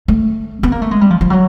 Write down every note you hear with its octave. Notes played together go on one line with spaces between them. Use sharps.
A3
B3
A#3
A3
G#3
G3
F3
F3
F#3